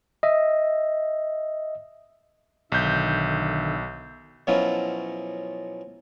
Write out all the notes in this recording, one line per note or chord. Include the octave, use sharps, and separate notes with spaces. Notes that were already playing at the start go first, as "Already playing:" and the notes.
D#5 E5
B1 D3 D#3 E5 G6
B2 F3 F#3 C#4 E4 F4